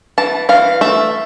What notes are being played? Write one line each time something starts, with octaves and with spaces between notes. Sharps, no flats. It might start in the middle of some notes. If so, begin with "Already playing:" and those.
E3 A5
E3 F5
A3 E5